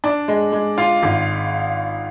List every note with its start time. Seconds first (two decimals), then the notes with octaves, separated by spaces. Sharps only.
0.04 D4
0.28 G#3
0.52 G#3
0.78 F4
1.03 G#1